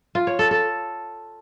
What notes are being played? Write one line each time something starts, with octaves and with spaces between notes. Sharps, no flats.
F4
C#5
A4
A4